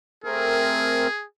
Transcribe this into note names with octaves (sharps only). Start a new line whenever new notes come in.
A3 C4 G#4 A#4